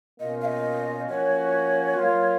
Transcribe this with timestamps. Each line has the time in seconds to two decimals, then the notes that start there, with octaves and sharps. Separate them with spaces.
0.20 B2 A#3 C#4 F4 D#5
0.41 F5
0.45 D#5
1.09 F3 A#3 C#4 F#4 C#5
1.96 F#3 A#3 F4